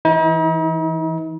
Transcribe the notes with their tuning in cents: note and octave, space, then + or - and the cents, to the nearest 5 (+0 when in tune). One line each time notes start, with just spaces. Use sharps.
E3 +0 D#4 +45